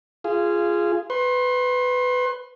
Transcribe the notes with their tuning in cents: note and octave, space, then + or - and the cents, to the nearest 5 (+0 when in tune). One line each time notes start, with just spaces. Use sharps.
F4 -15 G#4 -5 F5 -25
B4 +15 C6 +35